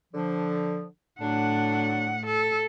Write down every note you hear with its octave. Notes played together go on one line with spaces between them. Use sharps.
D3 F3
A2 D3 F#3 D4 F#5
A4